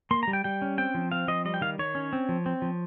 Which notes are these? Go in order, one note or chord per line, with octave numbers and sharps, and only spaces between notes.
A#3 C6
G3 A#5
G5
G3 G5
C#4
C4 G5
F3
C4 F5
F3 D#5
G3 D#5
G5
D#3 F5
D#3 C#5
C#4
C4
F3
C4
F3